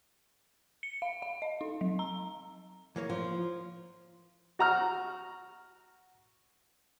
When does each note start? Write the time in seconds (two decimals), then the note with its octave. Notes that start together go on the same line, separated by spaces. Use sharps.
0.83 C#7
1.02 F5
1.22 F5
1.42 D#5
1.61 D#4
1.81 F#3
1.99 A#5
2.96 E3 A#3 C#5
3.10 F3
4.59 F#4 A#5 F6